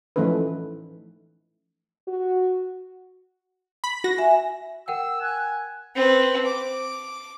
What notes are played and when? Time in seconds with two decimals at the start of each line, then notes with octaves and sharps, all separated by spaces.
0.16 E3 F3 A3 C#4 D#4 B4
2.07 F#4
3.84 B5
4.04 F#4 A#6
4.18 E5 G#5
4.88 A#4 F#5 G5 E6
5.21 G#5 F#6
5.96 C4 B4
6.45 D6